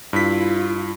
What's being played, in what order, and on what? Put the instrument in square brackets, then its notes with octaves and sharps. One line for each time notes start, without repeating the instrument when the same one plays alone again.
[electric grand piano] G2 B6 [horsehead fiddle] E4 F4